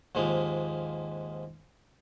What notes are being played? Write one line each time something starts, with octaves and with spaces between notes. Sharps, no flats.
D#2 G#2 F3 G#3 A#3